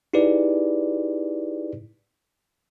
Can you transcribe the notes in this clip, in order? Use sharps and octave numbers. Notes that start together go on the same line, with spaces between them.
D#4 E4 G4 G#4 B4 D5